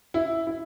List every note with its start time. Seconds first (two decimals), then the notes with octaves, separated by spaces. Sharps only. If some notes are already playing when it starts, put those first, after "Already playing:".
0.14 E4
0.47 E4